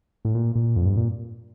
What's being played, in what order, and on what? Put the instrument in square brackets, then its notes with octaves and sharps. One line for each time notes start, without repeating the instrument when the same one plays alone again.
[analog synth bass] A2
A#2
A#2
F2
G2
A#2